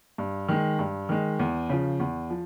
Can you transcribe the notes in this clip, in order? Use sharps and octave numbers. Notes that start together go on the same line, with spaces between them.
G2
D#3 G#3
G2
D#3 G#3
E2
C#3 F3
E2
F3